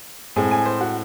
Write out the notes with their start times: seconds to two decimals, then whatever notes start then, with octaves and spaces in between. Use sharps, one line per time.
0.36 A2 G#3 C4 G#5
0.51 G#5
0.65 C5
0.81 F#4